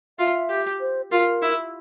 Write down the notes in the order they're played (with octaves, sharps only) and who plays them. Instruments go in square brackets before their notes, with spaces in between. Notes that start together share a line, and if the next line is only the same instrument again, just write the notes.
[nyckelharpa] F4 [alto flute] E5
[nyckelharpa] G4
[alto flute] C5
[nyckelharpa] F4 [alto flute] A#4
[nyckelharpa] E4